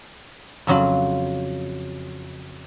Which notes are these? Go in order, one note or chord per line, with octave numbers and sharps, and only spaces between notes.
F2 C#3 F#3 F4 B5